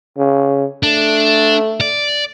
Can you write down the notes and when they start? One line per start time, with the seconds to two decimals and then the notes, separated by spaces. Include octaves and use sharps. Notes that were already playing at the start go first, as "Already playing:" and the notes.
0.17 C#3
0.83 A3 D4
1.81 D5